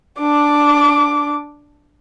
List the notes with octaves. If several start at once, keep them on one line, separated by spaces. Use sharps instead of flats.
D4 D6